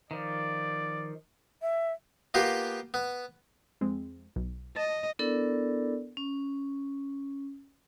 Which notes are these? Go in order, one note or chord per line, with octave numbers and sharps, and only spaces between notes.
D#3 F3 D5
E5
A#3 B3 F4 G4
B3
F2 G#3 C4
B1
D#5 A5
B3 D4 E4 A4 A#4 D5
C#4